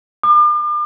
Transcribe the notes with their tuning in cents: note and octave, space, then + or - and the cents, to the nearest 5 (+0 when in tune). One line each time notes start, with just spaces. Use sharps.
D6 +40